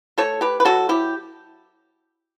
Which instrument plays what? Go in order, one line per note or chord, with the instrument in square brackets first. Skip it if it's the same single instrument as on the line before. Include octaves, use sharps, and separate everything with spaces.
[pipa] A3 A4 C#5
G4 B4
B4
F#3 F#4 A4
E4 G4